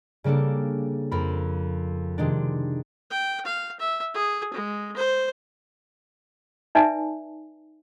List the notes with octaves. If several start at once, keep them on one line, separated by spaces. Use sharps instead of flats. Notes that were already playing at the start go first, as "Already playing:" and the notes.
C#3 G3 A#3 D4 A4
F2 A#4 B5
C3 D#3 G#3 D4
G5
F5
E5
G#4
G#3
C5
D#4 B4 D5 E5 G#5 A5